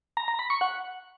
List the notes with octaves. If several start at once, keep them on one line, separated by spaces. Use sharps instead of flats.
A#5
A#5
B5
C#6
F#5